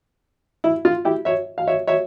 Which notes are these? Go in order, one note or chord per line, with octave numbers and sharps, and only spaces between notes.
E4
F4
E4 G4
C#5 E5
F5
C#5 E5
C#5 E5